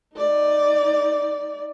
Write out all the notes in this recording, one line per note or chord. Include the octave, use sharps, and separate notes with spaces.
D#4 D5